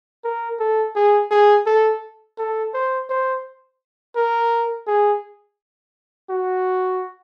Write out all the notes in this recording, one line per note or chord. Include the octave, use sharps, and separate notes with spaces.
A#4
A4
G#4
G#4
A4
A4
C5
C5
A#4
G#4
F#4